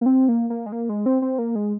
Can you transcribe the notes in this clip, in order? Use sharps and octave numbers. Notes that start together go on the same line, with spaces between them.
A#3
C4
A#3
A#3
G#3
A#3
G#3
C4
C4
A#3
G#3